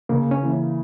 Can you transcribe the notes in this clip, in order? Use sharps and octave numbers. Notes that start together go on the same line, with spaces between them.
C#3 A#3
C#4
E3 A#3 E4